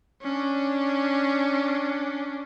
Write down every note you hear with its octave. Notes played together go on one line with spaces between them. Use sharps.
C#4 D4